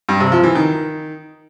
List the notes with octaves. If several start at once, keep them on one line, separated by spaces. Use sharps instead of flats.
G2
C3
F3
E3
D#3